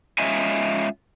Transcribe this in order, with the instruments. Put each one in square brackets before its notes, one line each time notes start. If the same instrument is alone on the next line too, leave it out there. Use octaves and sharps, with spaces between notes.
[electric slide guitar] G#3 C#4 F4 D#5 E5 G#5